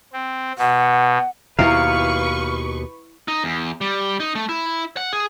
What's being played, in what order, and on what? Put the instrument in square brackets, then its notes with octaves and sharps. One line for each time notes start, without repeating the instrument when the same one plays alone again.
[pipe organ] C4
[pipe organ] B2 [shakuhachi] F#5
[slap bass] D#2 B2 [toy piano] E4 E5 A#5 [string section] B4 C#6 [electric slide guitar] F5
[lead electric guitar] D#4
E2
G3
D#4
A3
E4
F#5
G#4